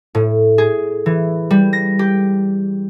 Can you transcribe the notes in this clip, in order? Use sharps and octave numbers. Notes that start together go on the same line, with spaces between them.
A2
G#4
E3
G3
A#6
G4